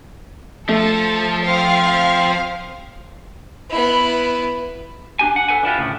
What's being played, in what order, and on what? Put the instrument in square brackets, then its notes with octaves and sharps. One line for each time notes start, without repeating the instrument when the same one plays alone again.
[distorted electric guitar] F3 [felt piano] A3 [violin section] A4
[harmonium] C4 [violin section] F5
[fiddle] B3 E4
[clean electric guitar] D4 G4 G#5
F#5
A4 B4 F#5 G#5
D4 E4 F4 G4
D2 A2 C#3